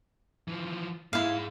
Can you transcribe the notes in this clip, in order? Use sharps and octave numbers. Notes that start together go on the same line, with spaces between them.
E3 F3
G#2 G#3 E4 F5